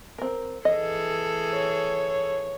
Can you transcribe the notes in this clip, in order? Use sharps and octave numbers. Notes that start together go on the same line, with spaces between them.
C4 A#4
E3 G#4 A4 D#5
C#5